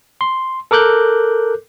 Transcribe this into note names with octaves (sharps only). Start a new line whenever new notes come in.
C6
A4 A#4 D6 F#6 G6